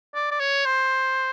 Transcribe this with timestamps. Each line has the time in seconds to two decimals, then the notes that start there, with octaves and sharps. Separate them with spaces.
0.14 D5
0.31 D5
0.40 C#5
0.65 C5